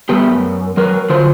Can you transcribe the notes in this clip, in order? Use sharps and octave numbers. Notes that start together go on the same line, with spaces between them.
G3 A3 B3 G4
F#2
F#3 A#4 B4
D3 F#3 F4 C5